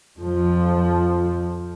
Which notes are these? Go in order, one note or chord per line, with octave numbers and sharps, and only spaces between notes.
F2 F3